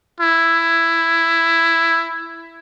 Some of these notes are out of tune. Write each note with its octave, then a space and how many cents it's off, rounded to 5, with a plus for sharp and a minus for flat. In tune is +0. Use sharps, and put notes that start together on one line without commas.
E4 +10